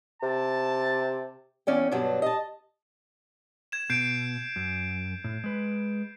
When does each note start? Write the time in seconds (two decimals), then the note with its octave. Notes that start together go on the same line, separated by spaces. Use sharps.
0.22 C3 A5
1.67 E2 C#4 D5 G5
1.92 G2 B2 F#3 D4
2.22 D#5 A5
3.72 G#6 E7
3.90 B2 G6 C7 D7
4.56 F#2
5.24 A2
5.44 G#3 B4